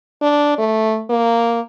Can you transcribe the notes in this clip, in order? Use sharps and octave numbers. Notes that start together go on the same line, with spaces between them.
D4
A3
A#3